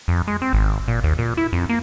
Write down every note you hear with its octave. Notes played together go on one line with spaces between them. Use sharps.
F2
G#3
C4
G#1
A#2
D#2
A#2
E4
F2
A#3